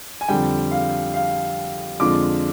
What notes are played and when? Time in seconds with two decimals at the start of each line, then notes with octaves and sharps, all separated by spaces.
0.21 G#5
0.28 F2 D3 G3 G5
0.72 F5
1.14 F5
2.00 F2 D3 G#3 D4 F4 D6